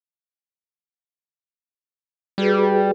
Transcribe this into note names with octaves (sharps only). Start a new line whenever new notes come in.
G3 F#4 G#4 B4